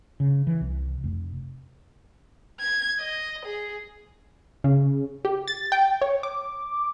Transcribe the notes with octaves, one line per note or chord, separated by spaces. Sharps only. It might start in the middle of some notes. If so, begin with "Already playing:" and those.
C#3
E3
C2
F1
G#6
D#5
G#4
C#3
G4
A6
G5
C#5
D6